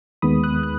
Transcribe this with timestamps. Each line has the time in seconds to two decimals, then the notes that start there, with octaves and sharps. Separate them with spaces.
0.22 D#2 D#3 G#3 B3 B5 D#6
0.44 D#6 F#6
0.63 F#6